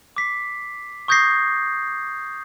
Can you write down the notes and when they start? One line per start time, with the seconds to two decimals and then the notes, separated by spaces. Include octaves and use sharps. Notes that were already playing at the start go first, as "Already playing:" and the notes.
0.16 D6 B6 C7
1.08 C#6 D#6 G6 G#6 A#6 C7